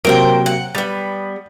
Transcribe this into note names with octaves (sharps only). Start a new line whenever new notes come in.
C3 F#3 A#3 A#4 C5 G5
F#5
G3 B3 A6